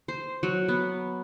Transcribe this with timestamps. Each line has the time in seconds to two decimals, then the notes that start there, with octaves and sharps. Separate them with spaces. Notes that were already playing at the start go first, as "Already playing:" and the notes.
0.08 C5
0.43 F#3
0.68 B3